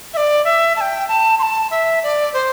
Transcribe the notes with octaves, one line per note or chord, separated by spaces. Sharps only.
E5
D5
E5
A5
G5
A5
C6
A5
E5
D5
C5